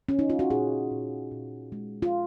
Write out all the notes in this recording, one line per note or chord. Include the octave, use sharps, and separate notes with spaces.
C#4
D#4
F4
F#4
A#2 G#4
A#2
A#2
G#3
F4